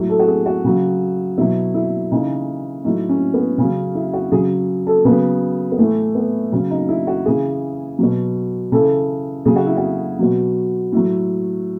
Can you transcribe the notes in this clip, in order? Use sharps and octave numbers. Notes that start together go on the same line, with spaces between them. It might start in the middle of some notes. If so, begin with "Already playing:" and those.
Already playing: A2 F#3
A4
F#4
G#4
F#4
C#3 F#3
B2 F#3 E4
E4
C#3 E3 D#4
A2 F#3 D#4
C#4
B3
C#3 F#3 C#4
E4
F#4
C#3 F#3 G#4
A4
C#3 F#3 B3
B3
A2 E3 A3
B3
C#3 F#3 C#4
D#4
E4
F#4
C#3 E3 G#4
B2 F#3
C#3 E3 A4
C#3 F#3 G#4
F#4
E4
F#4
B2 F#3
A2 F#3